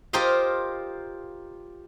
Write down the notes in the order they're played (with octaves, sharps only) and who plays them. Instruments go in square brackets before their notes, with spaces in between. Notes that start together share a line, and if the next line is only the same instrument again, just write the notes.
[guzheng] F4 G4 A#4 C5 D#5 F5